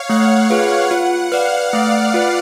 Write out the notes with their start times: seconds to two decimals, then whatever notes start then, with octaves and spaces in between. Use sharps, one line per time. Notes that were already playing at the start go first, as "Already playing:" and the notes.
Already playing: C#5 F5
0.09 A3 F#5
0.50 F4 G#4 B4 F5
0.91 F4 F#5
1.32 B4 D5 F5
1.73 A3 D5
2.14 F4 B4 F5